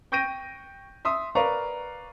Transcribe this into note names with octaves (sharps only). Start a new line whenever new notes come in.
G5 C#6 G6 A#6 D7 D#7
E5 C6 D#6
A#4 B4 D5 F5 A#5 C#6